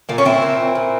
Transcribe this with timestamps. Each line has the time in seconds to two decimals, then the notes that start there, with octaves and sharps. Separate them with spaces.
0.09 A#2 A#3
0.18 C#4
0.25 C4 E4
0.42 A#2
0.75 A#2